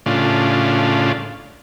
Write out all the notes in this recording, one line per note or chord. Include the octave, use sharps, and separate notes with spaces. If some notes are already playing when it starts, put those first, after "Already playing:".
A2 C#3 D4 F4